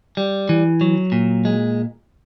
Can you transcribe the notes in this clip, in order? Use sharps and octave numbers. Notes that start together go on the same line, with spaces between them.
G3
E3
F#3
A#2
G#3